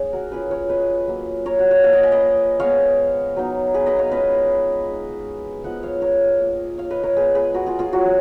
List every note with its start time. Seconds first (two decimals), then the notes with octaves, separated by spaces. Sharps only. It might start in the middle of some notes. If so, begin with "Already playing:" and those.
Already playing: A#3 D#4 G#4 C#5
0.13 F#4 A#4
0.32 A#3 C#4 F4 G#4 B4
0.51 A#4 C#5
0.69 B4 D#5
1.08 F#3 A#3 F4
1.46 A#4 C#5
1.59 F#4
1.71 C#5 F5
1.83 F3 A#3 C#4 C#5 F5
1.93 D#5 F#5
2.03 F5 G#5
2.12 B4 D#5
2.60 F3 G#3 B3 F4 C#5 F5
3.36 F#3 B3 D#4
3.74 G#4 B4
3.86 B4 D#5
3.99 C#5 F5
4.11 G#3 C#4 F4 B4 D#5
4.88 G#3 D#4
5.64 F3 B3 F4 D#5 F#5
5.83 C#5 F5
6.01 A#4 C#5
6.40 A#3 F4
6.78 C#5 F5
6.90 B4 D#5
7.03 A#4 C#5
7.16 G#3 B3 F4 G#4 B4
7.35 G#4 B4
7.54 F#4 A#4
7.66 F4 G#4
7.79 F4 G#4
7.92 F#3 C#4 F4 F#4